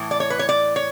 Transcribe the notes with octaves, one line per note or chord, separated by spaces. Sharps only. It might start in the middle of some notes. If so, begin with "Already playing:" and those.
Already playing: A2 E3
D5
C#5
B4
C#5
D5
C#5